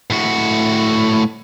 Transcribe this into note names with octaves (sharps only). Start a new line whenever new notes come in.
A2 F#4